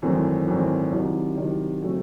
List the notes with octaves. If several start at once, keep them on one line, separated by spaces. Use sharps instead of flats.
G#1 F#2 E3 A3 C4
G#1 F#2 E3 A3 C4
C2 C3 D#3 F#3
C2 C3 D#3 F#3
C#3 F#3 A3 C4